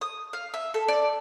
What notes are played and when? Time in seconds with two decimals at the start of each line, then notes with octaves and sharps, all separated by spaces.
0.01 D#6
0.33 F5
0.54 E5
0.74 A4
0.88 D5